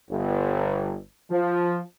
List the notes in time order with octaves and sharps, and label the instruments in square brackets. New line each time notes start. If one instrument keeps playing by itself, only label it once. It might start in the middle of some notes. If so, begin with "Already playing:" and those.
[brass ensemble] G1
F3